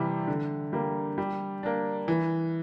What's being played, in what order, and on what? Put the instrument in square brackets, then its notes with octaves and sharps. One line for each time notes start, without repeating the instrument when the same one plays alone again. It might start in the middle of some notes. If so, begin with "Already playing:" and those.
Already playing: [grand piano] C3 E3 G3
D3
G3 A#3
G3
A#3 D4
E3